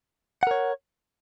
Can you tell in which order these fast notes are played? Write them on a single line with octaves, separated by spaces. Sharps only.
F#5 A#4 C#5